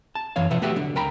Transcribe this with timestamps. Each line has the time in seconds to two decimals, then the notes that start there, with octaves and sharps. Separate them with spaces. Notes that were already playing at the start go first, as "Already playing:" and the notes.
0.15 A5
0.36 F#2 E3 E4 C#5 F5
0.50 B1 C3 F3 B4 E5 F#5
0.62 A3 B3 F#4 G4 E5 F#5
0.76 D3 F#3
0.95 C#2 A#4 G5 A#5 B5